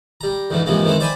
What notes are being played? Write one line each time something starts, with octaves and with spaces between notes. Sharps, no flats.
G3 A#5
D2 G#2 D3 E3
G#2 C3 E3 F3 G#3 A#3
D#3 E3 G#3 C4 E4
C5 D5 E5 G5 G#5 B5